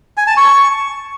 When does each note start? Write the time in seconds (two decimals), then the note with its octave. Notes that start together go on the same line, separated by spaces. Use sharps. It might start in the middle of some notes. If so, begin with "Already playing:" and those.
0.17 G#5
0.27 A5
0.37 C#6